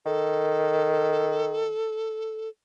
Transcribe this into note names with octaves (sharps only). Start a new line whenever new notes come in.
D#3 A4